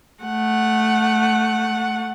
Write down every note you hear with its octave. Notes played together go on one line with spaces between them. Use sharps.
A3 F#5